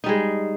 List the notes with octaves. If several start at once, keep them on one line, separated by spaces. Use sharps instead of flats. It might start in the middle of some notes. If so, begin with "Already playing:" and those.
G3 G#3 D#4